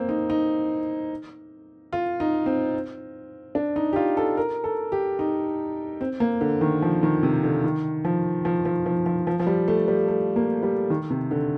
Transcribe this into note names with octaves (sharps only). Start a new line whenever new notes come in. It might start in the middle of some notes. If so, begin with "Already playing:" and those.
Already playing: A#3 C4
D#4
D#4
F4
D#4
C4
D4
D#4
G4
F4
A4
A#4
A4
G4
D#4
C4
A#3
D3
D#3
F3
D#3
C3
D3
D#3
F3
F3
F3
F3
F3
F3
F3
G3
A3
G3
A3
A#3
G3
D#3
C3
D3